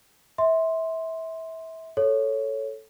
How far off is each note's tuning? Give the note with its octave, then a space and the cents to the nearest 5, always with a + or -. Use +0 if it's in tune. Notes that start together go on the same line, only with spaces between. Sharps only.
E5 -25 C6 +0
A4 +0 C#5 +0